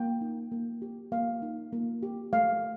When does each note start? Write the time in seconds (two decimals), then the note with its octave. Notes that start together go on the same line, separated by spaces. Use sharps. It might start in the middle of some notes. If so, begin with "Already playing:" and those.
Already playing: A#3 G5
0.21 D#4
0.52 A#3
0.82 G4
1.12 A#3 F5
1.42 D#4
1.73 A#3
2.03 G4
2.33 A3 F5